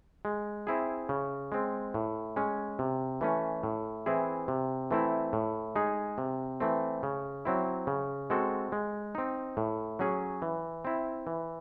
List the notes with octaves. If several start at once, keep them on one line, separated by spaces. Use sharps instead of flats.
G#3
C4 E4 G#4
C#3
G#3 C4
A2
G#3 C#4
C3
E3 A3 C#4
A2
E3 C4 E4 G#4
C3
E3 A3 C4 E4
A2
G#3 D#4 G#4
C3
E3 A3 C4
C#3
F#3 C4 E4
C#3
G#3 C4 F#4 A4
G#3
C4 D#4
A2
F#3 C#4 G#4
E3
C4 E4
E3